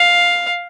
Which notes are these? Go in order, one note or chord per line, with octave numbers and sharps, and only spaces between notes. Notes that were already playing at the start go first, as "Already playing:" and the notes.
Already playing: F5